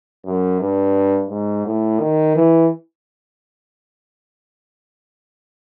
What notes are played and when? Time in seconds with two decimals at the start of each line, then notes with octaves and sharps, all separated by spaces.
0.26 F#2
0.61 G2
1.30 G#2
1.66 A2
2.00 D#3
2.36 E3